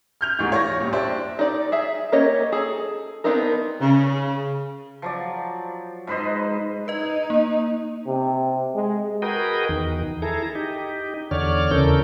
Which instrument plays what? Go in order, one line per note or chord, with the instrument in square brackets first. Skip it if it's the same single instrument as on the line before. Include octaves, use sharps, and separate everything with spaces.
[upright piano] F6 G6 F7
D#1 D2 G#2 E3 C#6
C#5 D5 C#6 G#6 A#6
A#2 G3
D4 G4 C5 E5
[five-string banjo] D#4 D5
G#4 E5
A#3 C#4 G4 C#5 D#5
G#4 A4
B3 C4 D4 D#4 A#4
[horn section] C#3
[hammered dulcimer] F3 F#3 D5
G#2 B4 C5 D#5
[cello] D#4 [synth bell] B4 D#5
[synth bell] A#3
[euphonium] C3
G#3
[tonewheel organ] F#4 G#4 A#4 B4 D#5 G5
E2 D#3
E4 G#4 A4 A#5
D#4 G4
E2 D3 C#5 D5 F6
D#2 C#3 E3 A4 A#4 G6